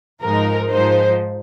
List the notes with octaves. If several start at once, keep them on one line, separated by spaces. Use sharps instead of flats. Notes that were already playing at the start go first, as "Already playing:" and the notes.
G#2 F3 G#3 D#4 A#4
G#2 F3 G#3 D#4 C5